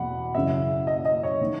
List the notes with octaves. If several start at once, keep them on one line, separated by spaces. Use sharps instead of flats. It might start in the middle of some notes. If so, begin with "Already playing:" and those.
Already playing: E2 B2 F#5 B5
F#2 C#3 E3 E5
D#5
D#5
C#5
D#3